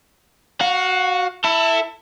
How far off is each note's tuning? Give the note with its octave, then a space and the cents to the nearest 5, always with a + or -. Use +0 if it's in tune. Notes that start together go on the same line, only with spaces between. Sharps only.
F#4 +0 F5 +35
E4 +0 A4 +25